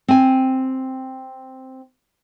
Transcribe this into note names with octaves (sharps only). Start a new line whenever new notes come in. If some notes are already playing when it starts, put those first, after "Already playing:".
C4 G#5